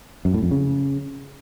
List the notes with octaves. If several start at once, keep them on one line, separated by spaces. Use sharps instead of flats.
F#2
A2
F2
C#3